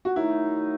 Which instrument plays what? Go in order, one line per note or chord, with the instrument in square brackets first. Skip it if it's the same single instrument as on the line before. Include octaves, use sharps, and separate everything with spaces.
[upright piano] F#4
[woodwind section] D#3 F#3 A3 D#4 [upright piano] E4